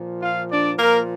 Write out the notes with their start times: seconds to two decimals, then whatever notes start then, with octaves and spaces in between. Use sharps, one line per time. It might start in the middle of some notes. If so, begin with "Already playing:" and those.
Already playing: A#2 F3
0.21 F4 F5
0.50 D4 D5
0.79 A#2 F3 A#3 A#4